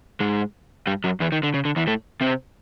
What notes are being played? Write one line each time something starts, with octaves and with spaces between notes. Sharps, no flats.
G#2 G#3
G2 G3
F#2 F#3
E2 E3
D#3
D3
C#3
D3
E2 E3
A2 A3
C3 C4